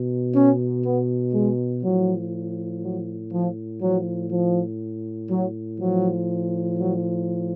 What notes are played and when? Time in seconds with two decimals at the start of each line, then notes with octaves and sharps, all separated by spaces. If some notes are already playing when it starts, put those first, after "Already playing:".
Already playing: B2
0.35 C#4
0.85 B3
1.34 G#3
1.83 A2 F3 F#3
2.82 F#3
3.32 F3
3.81 A2 F3 F#3
4.31 F3
5.29 F#3
5.79 A2 F3 F#3
6.78 F#3